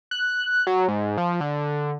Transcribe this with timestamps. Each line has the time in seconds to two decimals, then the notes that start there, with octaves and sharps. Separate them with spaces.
0.11 F#6
0.67 F#3
0.88 G#2
1.18 F3
1.40 D3